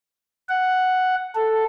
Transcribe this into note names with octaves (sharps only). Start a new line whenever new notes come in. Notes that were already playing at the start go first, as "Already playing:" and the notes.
F#5
A4